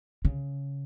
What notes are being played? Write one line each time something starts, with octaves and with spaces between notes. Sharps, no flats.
C#3